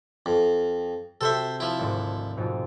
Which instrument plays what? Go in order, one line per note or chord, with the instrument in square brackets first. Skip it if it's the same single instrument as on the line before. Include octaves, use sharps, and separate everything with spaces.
[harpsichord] F2
[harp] C3 F#4 [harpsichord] A4 C5 E5
[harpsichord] F3 E4
[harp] G#1 D2 G#2
F2 G#2 B2